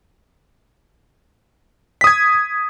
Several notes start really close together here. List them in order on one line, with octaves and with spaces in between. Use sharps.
B6 D#6 G#6